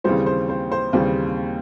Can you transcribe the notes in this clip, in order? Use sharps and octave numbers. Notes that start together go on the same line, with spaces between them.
D#2 C#3 E3 G3 C4 C5
C5
C5
C5
D#2 C#3 E3 G3 C4